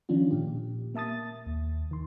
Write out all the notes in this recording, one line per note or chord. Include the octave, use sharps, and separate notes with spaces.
D#3 F3 C#4 D4 F4
A#2 G4
A#3 E5 A5 D#6 A6
D#2
D#3 C6